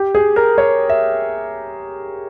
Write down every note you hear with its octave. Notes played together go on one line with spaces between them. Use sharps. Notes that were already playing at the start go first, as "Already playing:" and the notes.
Already playing: G4
G#4
A#4
C#5
E5